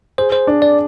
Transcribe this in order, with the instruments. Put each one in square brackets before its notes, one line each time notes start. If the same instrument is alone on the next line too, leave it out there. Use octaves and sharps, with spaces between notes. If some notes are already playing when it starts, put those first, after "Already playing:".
[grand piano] G#4 [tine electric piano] C5
[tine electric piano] C5
[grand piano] D4
[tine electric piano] D5